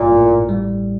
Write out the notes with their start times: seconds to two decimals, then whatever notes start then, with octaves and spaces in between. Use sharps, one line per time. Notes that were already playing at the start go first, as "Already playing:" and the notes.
Already playing: A1 G2 A#2
0.12 A2
0.49 G3